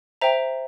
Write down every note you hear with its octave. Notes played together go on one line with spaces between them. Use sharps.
C5 E5 G5 A#5